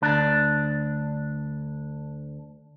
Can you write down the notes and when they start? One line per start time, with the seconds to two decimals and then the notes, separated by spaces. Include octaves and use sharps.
0.02 D2 D4